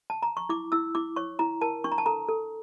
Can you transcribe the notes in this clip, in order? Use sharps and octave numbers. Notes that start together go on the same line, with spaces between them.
A5
A#5
C#6
E4 D6
E4 E6
E4 D6
C#5 C#6
E4 A#5
A#4 A5
D4 C#6
A#5
A5
A4 A#5
A4